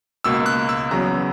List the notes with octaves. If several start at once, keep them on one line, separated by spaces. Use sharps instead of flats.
C#2 B2 A#3 E6
F#6
E6
E2 C#3 F#3 B3 A#5